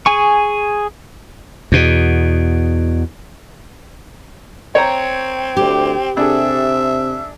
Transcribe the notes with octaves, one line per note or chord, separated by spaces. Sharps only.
G#4 G#5 C#6
E2 B2
C4 C#5 G5 A#5
D2 G4
C3 D4 G#4 A4 E5